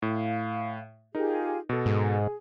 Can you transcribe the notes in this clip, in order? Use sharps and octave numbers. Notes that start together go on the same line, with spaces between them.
A2 F5
D#4 F4 G4 G#4 A#4
B2 A4
G#2 G#4